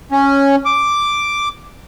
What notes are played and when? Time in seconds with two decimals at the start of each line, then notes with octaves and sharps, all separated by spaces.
0.12 C#4
0.66 D6